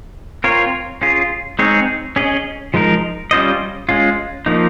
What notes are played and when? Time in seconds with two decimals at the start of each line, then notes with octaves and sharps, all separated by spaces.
0.44 C4 F4 A#4 C#5
1.02 C#4 F4 G#4
1.59 G#3 C4 D#4 G#4 C#5
2.16 C#4 G#4 D#5
2.74 F3 G#3 D#4 A#4
3.31 G3 C#4 F4 C5 D#5
3.89 G#3 C#4 F4
4.46 F3 A#3 D#4